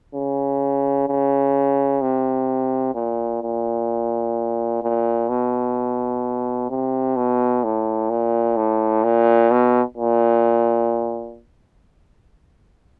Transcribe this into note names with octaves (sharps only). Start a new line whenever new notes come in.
C#3
C#3
C3
A#2
A#2
A#2
B2
C3
B2
A2
A#2
A2
A#2
B2
A#2